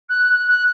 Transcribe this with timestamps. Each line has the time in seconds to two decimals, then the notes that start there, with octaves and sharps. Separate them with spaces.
0.09 F#6
0.33 F#6
0.48 F#6